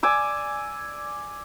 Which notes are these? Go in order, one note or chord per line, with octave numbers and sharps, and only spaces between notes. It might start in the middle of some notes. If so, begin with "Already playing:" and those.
D5 G#5 D6 E6